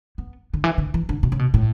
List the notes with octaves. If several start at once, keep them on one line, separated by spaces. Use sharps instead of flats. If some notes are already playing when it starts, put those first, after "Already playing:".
B3
D3
E3
D3
E3
D3
B2
C#3
B2
A2